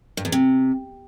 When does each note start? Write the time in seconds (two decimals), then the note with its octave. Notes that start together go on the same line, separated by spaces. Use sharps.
0.17 G2
0.25 E2
0.32 C3